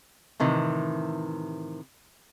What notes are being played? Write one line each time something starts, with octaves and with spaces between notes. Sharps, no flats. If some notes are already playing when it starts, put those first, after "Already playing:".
A2 C3 D#3 E3